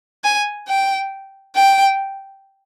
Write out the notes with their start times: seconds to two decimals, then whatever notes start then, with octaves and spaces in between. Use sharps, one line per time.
0.24 G#5
0.68 G5
1.55 G5